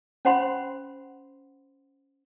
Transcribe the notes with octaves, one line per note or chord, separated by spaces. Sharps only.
C#4 C5 F#5 B5 C6